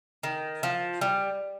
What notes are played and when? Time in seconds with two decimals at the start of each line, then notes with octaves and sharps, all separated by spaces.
0.23 D#3
0.63 F3
1.01 G3